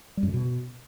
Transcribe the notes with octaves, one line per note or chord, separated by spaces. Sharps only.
G3
F#2
D3
B2